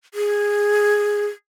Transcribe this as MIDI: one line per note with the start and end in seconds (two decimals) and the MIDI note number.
0.14 1.26 68